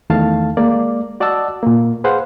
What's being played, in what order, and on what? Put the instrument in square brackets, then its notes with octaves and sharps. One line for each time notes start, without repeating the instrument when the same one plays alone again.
[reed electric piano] E2 D#3 A3 F5 A5
G#3 A#3 D5
F#4 D5 D#5 F#5 A5 E6
A#2 A#3
G#4 B4 C5 F5 F#5